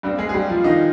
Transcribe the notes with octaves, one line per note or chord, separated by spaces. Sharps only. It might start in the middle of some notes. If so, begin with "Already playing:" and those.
G2 G3 C4
G#3 G#4
G#4
G3 G4
F3 F4
D#3 D#4